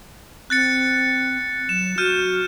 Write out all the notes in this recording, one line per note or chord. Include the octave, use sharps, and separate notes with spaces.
C4 F#6 A6 C#7
F#3 E7
F#4 F6 G6 D#7